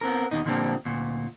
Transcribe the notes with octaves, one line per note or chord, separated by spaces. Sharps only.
B3 C4 A#4
D#2 B2 D#4
A#2 D3 F3 G3 A#3 C4
D2 A#2